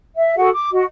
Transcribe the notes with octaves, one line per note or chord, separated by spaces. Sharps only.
E5
F#4 G#4 A4 F#5
D6
F#4 D#5